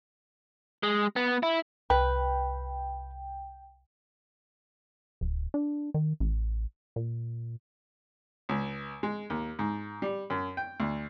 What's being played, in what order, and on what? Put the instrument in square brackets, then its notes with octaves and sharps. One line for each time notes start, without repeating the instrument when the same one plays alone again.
[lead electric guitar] G#3
B3
E4
[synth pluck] C2 [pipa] B4 [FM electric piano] G5
[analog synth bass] D1
D4
D#3
A1
A#2
[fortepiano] C#2
G#3
D#2
G#2
G3
F#2
G5
D2